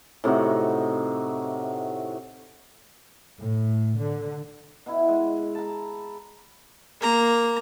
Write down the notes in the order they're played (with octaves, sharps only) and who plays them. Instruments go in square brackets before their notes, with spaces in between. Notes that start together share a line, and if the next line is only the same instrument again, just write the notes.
[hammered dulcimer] A2 C3 D#4 F#4
[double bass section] A2
D3
[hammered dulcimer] B2 E4
G#3
A5 A#5
[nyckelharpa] A#3 A#5